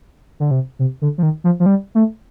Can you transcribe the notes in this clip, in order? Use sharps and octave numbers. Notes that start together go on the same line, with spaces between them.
D3
C3
C3
D3
F3
D#3
F3
F3
G3
A3